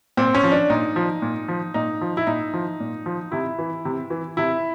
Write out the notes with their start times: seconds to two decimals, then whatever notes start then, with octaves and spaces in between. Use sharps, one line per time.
0.17 A#2 C4
0.35 C#4
0.43 F3
0.52 D4
0.70 A#2 D#4
0.96 F3
1.22 A#2
1.48 F3
1.74 A#2 D#4
2.01 F3
2.17 E4
2.27 A#2 D#4
2.54 F3
2.80 A#2
3.06 F3
3.32 C3 E4
3.59 E3
3.85 C3
4.10 E3
4.37 C3 E4